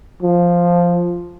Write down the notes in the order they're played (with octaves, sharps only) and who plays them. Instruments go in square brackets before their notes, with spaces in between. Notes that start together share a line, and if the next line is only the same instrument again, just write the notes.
[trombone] F3